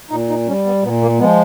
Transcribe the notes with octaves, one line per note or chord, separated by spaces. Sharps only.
A#2 D#4
D#4
G3 C#4
B3
A#2 B3
A#3
F3 G#3 B3